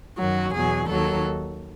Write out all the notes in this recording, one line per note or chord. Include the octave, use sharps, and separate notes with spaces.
F#2 D#3 F#3 F#4
E2 B2 F#3 G#4
D#2 D#3 F#3 A4